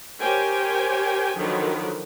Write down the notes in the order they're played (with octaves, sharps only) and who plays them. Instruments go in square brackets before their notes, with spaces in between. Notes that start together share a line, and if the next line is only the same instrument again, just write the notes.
[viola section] G4 A#4 C5 C#5 G5 G#5
D3 D#3 F3 F#3 A#4 B4